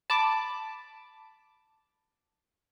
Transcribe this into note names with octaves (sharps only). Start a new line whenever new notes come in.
A5 B5 D6